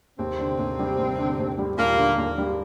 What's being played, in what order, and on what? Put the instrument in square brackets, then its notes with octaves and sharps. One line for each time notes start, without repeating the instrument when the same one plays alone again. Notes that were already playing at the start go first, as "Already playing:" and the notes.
[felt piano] D#2 [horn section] C3 C4
[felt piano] D3
D#2
G3
D#2
D3
D#2
G3
[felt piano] D#2 [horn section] A#2 A#3
[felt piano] D3
D#2
G3